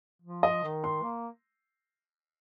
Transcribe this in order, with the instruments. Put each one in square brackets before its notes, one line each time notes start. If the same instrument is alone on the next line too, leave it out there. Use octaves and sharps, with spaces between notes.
[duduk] F3
[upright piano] D#5
[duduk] D#3
[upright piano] C6
[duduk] A#3